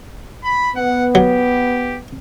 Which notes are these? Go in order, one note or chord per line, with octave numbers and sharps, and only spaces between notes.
B5
B3 F#5
F#3 G4